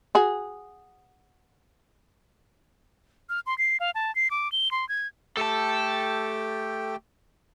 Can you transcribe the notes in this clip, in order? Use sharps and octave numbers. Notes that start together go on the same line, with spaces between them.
F#4 G#4
F6
C6
C7
F5
A5
C7
D6
G7
C6
G#6
A3 G4 A4 G5 A5